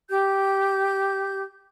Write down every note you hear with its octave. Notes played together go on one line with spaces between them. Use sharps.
G4 G6